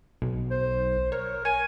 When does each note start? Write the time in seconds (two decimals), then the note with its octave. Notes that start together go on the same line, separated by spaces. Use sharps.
0.22 B1
0.51 C5
1.12 A#4 C#5
1.45 C#5 G#5